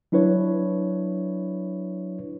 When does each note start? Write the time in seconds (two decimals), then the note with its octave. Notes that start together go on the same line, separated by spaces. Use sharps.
0.12 F#3 D4 E4 B4 C#5